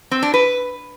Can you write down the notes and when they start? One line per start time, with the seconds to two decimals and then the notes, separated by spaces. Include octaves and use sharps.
0.11 C4
0.23 D4
0.34 B4